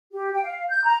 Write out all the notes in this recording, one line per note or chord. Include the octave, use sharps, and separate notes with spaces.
G4
G5
F5
G6
A#5